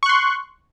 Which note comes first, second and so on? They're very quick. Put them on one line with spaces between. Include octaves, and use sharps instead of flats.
C#6 F#6 C6